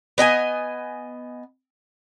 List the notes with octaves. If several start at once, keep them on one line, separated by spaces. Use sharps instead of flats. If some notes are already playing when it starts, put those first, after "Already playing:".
B3 D#5 G5 G#5